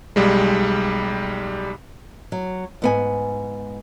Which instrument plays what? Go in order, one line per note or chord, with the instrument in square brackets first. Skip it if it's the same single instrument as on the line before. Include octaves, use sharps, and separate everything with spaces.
[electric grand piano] B1 G3 G#3
[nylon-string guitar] F#3
G#2 B3 G#5